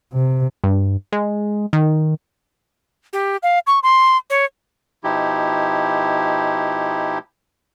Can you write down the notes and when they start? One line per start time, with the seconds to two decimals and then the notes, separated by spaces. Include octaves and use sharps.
0.13 C3
0.64 G2
1.12 G#3
1.73 D#3
3.13 G4
3.43 F5
3.67 C#6
3.83 C6
4.30 C#5
5.04 B2 F3 D#4 E4 G4